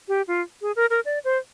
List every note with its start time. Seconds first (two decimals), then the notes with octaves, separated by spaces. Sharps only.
0.08 G4
0.28 F4
0.62 G#4
0.76 A#4
0.90 A#4
1.05 D5
1.24 C5